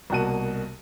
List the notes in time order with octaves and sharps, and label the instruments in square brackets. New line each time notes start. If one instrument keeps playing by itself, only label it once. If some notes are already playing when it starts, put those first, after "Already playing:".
[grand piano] C2 B2 A#3 F#4 A5 D#7